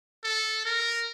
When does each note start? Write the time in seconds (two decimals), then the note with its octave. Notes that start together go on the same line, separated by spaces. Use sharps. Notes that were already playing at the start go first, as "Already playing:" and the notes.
0.24 A4
0.65 A#4